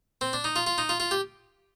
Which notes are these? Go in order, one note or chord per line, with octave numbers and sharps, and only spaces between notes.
C4
D4
D#4
F4
F4
D#4
F4
F4
G4